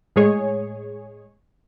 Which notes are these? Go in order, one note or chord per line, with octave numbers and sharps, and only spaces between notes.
A2 G#3 G#4 C#5